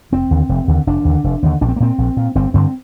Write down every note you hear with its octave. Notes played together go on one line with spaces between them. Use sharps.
F1 C4
D#2 D3
F1
D#2 D3
F1 D4
D#2 D3
F1
D#2 D3
A#1 D4
C4
A#3
A#2 C4
A#1
A#2
G1 C4
G2 D3 C4